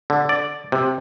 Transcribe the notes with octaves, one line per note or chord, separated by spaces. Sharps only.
D3
D5
C3